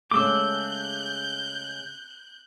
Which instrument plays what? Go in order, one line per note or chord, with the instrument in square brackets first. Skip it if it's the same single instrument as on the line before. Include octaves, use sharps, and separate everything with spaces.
[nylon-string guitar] C#3 G#3 A3 [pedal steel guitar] D6 E6 [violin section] F#6 G6